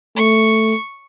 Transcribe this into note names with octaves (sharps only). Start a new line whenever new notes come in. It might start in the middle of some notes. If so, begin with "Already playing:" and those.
A3 C#6